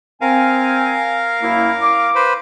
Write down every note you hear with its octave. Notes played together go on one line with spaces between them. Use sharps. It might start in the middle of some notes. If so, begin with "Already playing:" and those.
C4 A#4 F5 G#5
F#2 A#3 E4
D6
B4 C5